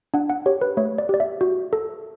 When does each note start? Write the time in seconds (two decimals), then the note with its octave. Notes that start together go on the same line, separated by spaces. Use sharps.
0.14 D4 F#5
0.30 F#5
0.46 G4 C#5
0.61 B4
0.77 A3 C#5
0.98 D5
1.09 G4 D5
1.20 E5
1.41 F#4
1.73 A4